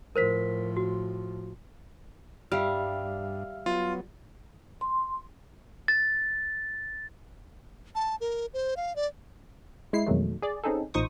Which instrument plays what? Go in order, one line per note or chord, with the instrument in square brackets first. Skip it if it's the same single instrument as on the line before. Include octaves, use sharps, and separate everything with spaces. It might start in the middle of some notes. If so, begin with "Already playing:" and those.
[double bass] A2 F3 [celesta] A#4 C5 B6
[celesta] F#4
[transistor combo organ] G2 [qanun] G3 [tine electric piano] E5 F5 F6
[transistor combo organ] F#3 B3 [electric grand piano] F4
[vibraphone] C6
[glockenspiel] A6
[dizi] A5
A#4
C5
F5
D5
[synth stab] G#3 E4 C7
F2 B2 D#3 F#3 G#3 A3
G#4 D5
C4 C#4 D#4 G#4 A4
A1 A#2 D#4 C5 C#6 D#6